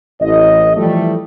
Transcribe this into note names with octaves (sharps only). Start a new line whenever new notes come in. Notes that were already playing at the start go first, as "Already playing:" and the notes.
A1 D#5
E3 F3 G3 A3